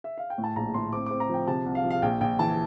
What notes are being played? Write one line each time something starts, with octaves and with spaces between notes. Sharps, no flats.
E5
F5
G5
A2
A5
A#1 A#5
A2 C6
C4 D6
C4 D6
A#5
F3 G5
C3 A5
C2
F5
F3
F5
A#1 G5
A#1 G5
E3 A5